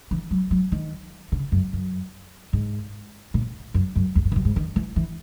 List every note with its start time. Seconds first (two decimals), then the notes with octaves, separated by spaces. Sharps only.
0.11 E3
0.31 F#3
0.51 F#3
0.72 D#3
1.32 C#3
1.52 F#2
1.73 F#2
2.53 G#2
3.34 A#2
3.74 F#2
3.96 F#2
4.15 E2
4.25 F#2
4.32 E2
4.36 F#2
4.45 G#2
4.56 D#3
4.76 E3
4.96 E3